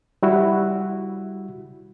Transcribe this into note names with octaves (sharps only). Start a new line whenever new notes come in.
G3 E4 F#4